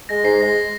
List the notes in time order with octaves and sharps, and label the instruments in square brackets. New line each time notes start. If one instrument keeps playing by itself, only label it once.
[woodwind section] G#3 [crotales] A#6
[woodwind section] G#2 [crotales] C7
[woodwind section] G#3 [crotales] A#6